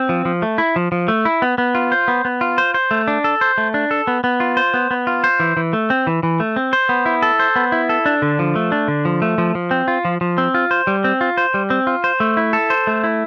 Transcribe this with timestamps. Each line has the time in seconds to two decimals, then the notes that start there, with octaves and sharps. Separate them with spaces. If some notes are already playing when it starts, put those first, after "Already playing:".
Already playing: C4
0.09 F3
0.25 F3
0.42 A3
0.58 E4
0.76 F3
0.92 F3
1.08 A3
1.25 E4
1.42 B3
1.58 B3
1.75 F4
1.92 C5
2.08 B3
2.25 B3
2.41 F4
2.58 C5
2.74 C5
2.91 A3
3.08 D4
3.24 A4
3.41 C5
3.58 A3
3.74 D4
3.91 A4
4.07 B3
4.24 B3
4.40 F4
4.57 C5
4.74 B3
4.91 B3
5.07 F4
5.24 C5
5.40 E3
5.57 E3
5.73 A3
5.90 C4
6.07 E3
6.23 E3
6.40 A3
6.56 C4
6.73 C5
6.89 B3
7.06 E4
7.22 A4
7.39 C5
7.56 B3
7.72 E4
7.89 A4
8.06 D4
8.22 D3
8.39 F3
8.55 A3
8.72 D4
8.88 D3
9.05 F3
9.22 A3
9.38 F3
9.55 F3
9.71 C4
9.88 F4
10.05 F3
10.21 F3
10.38 C4
10.54 F4
10.71 C5
10.87 G3
11.04 C4
11.21 F4
11.37 C5
11.54 G3
11.70 C4
11.87 F4
12.04 C5
12.20 A3
12.37 E4
12.53 A4
12.70 C5
12.87 A3
13.04 E4